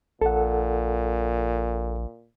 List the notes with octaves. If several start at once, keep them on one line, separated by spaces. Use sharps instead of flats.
A#1 A#2 A4 F#5